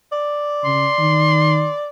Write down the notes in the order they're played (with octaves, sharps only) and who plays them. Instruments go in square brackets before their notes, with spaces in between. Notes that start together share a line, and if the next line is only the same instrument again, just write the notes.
[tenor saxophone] D5
[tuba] C#3 [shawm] C6
[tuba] D#3